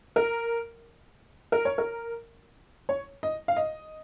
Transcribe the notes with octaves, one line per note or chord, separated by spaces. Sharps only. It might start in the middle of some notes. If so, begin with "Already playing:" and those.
A#4
A#4
C#5
A#4
C#5
D#5
F5
D#5